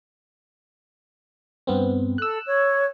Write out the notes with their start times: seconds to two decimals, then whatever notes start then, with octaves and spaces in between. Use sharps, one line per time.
1.67 G2 B3 C4
2.18 A4 E6 F#6
2.47 C#5